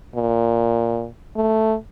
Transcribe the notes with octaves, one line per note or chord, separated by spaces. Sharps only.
A#2
A3